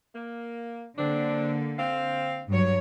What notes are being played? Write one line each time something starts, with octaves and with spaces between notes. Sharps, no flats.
A#3
D3 F#3 A#3 C4 D4
C4 F5
G2 F#3 C#5